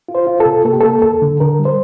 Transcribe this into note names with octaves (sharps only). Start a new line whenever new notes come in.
F4
C5
F4
A4
C3
A#3 A4
G4
A#3 A4
D#2 A4
D3
D3 A#4
G3
C5